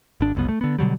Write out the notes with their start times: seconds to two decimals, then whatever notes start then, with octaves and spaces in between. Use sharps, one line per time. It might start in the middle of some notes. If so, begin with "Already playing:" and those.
0.21 G#1 D4
0.35 F#1 C2 B3
0.49 A3
0.61 D3 B3
0.79 B2 D3 F#3 G3